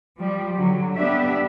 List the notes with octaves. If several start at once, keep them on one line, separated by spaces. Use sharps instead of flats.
F3 G3
D3 F#3
B3 D4 G4 E5